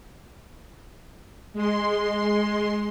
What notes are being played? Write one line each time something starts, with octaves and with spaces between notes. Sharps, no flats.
G#3 C6